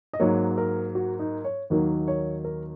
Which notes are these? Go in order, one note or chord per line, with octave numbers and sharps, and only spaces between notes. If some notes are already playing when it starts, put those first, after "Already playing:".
D#5
G#2 F#3 A#3 C#5
A#4
F#4
D#4
C#5
D#2 D#3 F#3 A#3
C#5
A#4